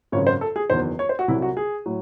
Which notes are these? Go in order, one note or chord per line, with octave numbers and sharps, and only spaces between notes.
G#1 F#2 C#3 F#3 C#5
C5
A4
G#4
F#1 E2 D#3 F#3 C5
C#5
C5
F#4
C2 C3 F#3 E4
F#4
G#4
A2 F#3